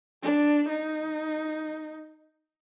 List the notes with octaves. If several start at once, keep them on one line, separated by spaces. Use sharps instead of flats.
D4
D#4